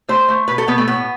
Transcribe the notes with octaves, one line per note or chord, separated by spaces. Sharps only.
A3 C5
A3
B2 B4
A4
B2 B3
A3
A2 B3